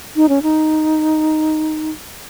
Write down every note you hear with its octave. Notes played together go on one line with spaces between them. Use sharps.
D#4
C#4
D#4